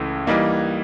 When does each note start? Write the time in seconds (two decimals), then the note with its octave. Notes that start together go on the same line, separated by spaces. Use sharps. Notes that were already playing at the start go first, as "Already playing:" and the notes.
Already playing: C#2 C#3 E3 A3
0.27 E3 G3 A#3 D#4